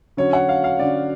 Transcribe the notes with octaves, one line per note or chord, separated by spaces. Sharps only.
D3 F#3 C#4 C#5
F#5
F5
F5
D3 F#3 C#4 D5